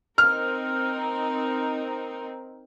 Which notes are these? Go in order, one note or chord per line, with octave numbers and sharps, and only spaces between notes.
C4 D#4 A#4 F6